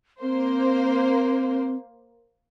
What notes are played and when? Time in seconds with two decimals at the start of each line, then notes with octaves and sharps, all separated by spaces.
0.22 A#3 C4 C5